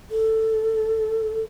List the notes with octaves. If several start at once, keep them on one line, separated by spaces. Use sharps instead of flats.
A4